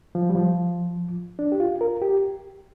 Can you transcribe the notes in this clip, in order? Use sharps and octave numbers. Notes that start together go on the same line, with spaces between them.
F3
G3
F3
D4
G4
F4
A#4
G4